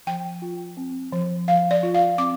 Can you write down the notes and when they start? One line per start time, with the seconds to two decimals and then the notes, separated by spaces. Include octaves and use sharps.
0.07 F3 G5
0.42 F4
0.77 C4
1.12 F3
1.48 F3 F5
1.71 D5
1.83 F4
1.94 F5
2.18 C4 D6